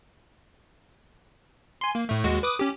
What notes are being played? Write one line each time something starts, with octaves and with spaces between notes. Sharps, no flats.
G#5 C6
A#3
A2 A3
D#2 G#3 F#4
B4 D6 D#6
C#4 G4